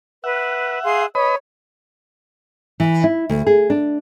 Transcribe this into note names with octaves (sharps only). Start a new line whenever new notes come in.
B4 E5 F#5
G#4 F5 C6
B4 C#5 D#5 B5
E3
E4
D2
G#4
D4